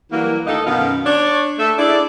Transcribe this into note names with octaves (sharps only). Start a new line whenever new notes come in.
E3 F#3 G3 A#3
D2 D#3 D#4 A4 D#5 F5
F#2 B2 D#3 B3 F5
D4 C#5 D5
A3 A4 E5
D4 E4 G#4 D5